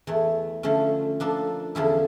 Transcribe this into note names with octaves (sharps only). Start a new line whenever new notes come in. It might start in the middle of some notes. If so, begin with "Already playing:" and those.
E2 E3 A3
D3 F3 A3 C#4
F3 A#3 D4 A4
E2 D3 F3 C#4 E4